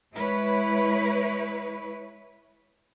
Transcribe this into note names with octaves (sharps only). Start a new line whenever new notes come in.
G#3 E4 B4 C#5